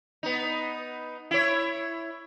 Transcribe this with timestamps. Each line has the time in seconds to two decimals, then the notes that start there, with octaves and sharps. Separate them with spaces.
0.23 B3 D#4
1.31 E4 C#5